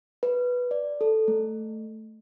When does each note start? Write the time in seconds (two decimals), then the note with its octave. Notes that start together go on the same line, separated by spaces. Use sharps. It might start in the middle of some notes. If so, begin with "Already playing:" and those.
0.23 B4
0.71 D5
1.01 A4
1.28 A3